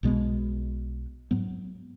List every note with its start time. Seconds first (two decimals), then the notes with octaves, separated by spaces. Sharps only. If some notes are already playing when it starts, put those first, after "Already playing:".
0.03 B1 B2 G#3 B3
1.31 G#2 F#3 B3